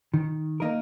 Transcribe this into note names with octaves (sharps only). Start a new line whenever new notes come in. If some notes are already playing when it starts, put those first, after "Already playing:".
D#3
A#3 D#4 A#4